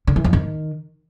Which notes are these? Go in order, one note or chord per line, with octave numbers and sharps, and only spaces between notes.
D3
E3
F2
D#3